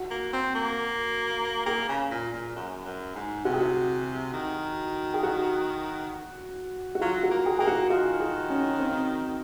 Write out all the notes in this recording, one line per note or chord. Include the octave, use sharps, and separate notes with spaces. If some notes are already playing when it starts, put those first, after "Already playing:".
Already playing: F#4
A#3
C4
A#3
A#3 G#4
C#3
A#2
A#2
F#2
F#2
G#2
C3 F#4
G#4
F#4
D#3
G#4
F#4
F#4
F#3 F4
F#4
A#3
G#4
A#3 G#4
F#4
D#3 F4
G#4
C#4
C4